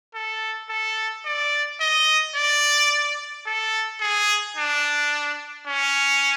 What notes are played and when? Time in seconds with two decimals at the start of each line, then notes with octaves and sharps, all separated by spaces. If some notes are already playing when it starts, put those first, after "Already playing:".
0.15 A4
0.70 A4
1.26 D5
1.81 D#5
2.36 D5
3.47 A4
4.01 G#4
4.57 D4
5.67 C#4